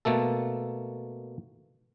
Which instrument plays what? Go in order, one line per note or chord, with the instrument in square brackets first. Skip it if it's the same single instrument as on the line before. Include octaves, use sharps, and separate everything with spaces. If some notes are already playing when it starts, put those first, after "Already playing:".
[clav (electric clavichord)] B2 A3 A#3 A4